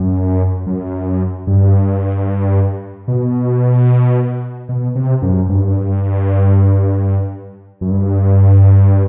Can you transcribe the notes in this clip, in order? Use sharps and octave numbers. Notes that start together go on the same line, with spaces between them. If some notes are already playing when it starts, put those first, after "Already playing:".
Already playing: F#2
F#2
G2
B2
B2
C3
F#2
G2
F#2
G2